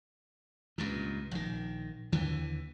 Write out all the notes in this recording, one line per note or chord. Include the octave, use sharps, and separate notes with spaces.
C#2 G2 A#2
A#1 D#3
D#2 D3 E3